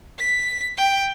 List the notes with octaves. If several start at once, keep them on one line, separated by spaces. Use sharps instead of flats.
B6
G5